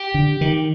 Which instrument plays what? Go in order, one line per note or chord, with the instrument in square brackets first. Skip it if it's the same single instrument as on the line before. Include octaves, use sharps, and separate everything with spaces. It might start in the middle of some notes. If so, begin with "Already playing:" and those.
Already playing: [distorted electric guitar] G4
[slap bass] D3
D#3